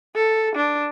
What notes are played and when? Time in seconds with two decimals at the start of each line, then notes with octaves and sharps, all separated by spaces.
0.15 A4
0.56 D4